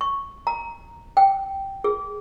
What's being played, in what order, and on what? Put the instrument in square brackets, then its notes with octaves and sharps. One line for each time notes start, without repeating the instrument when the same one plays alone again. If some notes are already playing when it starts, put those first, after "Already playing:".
[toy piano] C#6
A#5
G5
G#4